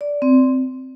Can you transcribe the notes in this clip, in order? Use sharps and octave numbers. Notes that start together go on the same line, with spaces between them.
D5
C4